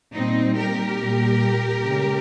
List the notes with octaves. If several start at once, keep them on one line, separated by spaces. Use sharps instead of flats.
A#2 G3 C4 D#4
G4 A#4
A#2 G3
C#3 G#3